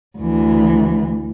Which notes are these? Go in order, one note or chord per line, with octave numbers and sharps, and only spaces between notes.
D2 E3